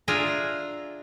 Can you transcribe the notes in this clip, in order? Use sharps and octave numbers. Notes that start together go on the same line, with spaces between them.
D4 F4 G#4 E5 A#5